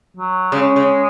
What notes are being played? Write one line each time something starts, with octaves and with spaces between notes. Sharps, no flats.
F#3
C#3 G#3
C#3